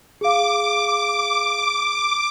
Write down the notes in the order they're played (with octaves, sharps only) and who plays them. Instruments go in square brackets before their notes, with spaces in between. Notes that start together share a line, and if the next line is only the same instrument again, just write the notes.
[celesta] G#4 F5 [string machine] D6